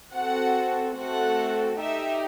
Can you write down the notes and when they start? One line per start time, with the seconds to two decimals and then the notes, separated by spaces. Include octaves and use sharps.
0.14 C4 F#4 A4 F#5
0.97 A3 C4 F#4 A4 F#5
1.79 D#4 G4 E5